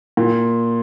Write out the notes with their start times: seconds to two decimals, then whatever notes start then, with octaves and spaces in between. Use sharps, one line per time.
0.17 A#2